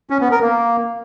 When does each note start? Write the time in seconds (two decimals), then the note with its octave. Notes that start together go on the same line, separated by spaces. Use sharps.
0.10 C#4
0.21 B3
0.31 A#4
0.42 A#3